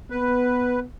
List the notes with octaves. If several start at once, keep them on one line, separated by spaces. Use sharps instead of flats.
B3 B4